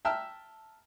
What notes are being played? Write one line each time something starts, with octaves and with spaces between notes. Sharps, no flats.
E5 G5 A5 A#5 E6 F6